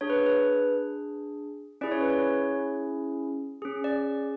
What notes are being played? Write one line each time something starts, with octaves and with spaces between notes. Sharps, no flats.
D4 G#4 C#5
B4
B4
C#4 E4 G#4 D5
C#5
B4
C#5
C#4 G#4
D5